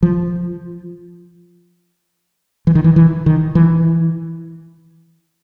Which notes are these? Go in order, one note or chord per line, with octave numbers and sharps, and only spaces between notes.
F3
E3
D#3
E3
E3
D#3
E3